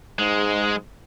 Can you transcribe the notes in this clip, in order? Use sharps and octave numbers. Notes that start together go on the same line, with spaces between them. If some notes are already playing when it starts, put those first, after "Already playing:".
G#2 G#3